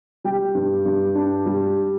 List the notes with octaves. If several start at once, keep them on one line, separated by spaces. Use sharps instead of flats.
G3 G5
G2
G2
D4
G3